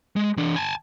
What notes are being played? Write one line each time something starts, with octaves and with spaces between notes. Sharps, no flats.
G#3
E3 D4
G#5 A5